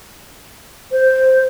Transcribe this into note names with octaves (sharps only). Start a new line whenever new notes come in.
C5